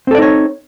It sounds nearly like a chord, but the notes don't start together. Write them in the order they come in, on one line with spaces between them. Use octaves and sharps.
C4 A4 D5 D#4 C#5